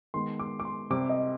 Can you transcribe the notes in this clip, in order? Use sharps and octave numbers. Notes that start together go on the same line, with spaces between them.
D#3 G#3 B3 C6
D6
D6
C6
C3 G3 C4 D6
D#5